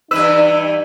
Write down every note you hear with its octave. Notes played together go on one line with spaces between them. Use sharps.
G2 E3 D#4 B4 E6